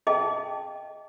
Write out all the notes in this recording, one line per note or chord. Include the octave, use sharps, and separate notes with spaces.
G#4 D#5 F5 G5 A5